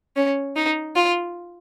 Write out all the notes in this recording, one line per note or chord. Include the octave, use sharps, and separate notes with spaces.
C#4
D#4
F4